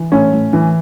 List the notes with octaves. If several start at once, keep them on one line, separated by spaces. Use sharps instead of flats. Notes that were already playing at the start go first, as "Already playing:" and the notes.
Already playing: E3
A2 C#4
A2
E3